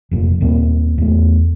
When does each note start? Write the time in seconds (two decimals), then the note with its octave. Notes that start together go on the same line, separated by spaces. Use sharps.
0.11 F1 F2 A#2
0.41 D#2 A#2 A#3 C4
0.98 E2 A3